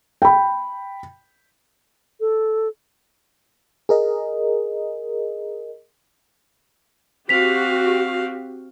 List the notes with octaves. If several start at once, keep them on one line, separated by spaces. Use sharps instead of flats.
G5 B5
A4
G#4 A#4 D#5
C4 F#4 G4 F5 B6 F7